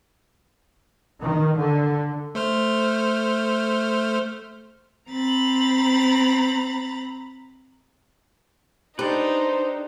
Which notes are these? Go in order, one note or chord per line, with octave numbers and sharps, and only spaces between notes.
D#3
D3
A3 C5 F6
C4 A#5 B5 A6
D4 D#4 G4 A4 B4 C5